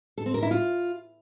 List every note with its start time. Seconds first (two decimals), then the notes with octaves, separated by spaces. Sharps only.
0.18 A4
0.26 C4
0.34 A#4
0.42 E4
0.51 F4